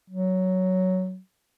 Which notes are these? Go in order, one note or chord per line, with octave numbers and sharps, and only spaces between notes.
F#3